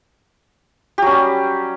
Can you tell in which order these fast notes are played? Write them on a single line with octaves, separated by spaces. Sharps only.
G4 F#3 C#4 G3